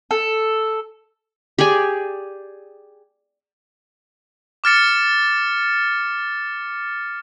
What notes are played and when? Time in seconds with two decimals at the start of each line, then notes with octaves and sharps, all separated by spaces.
0.11 A4
1.58 G4 G#4 D5 G#5
4.64 D6 F6 A6 C#7